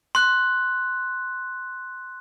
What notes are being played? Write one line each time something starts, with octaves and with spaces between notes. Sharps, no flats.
C6 F#6